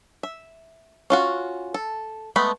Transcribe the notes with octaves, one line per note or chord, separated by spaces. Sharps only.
E5
C#4 F4 F#4
A4
G#3 A3 B3 B5